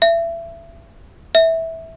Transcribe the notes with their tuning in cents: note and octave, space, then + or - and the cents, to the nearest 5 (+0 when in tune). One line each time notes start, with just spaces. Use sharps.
E5 +30
E5 -15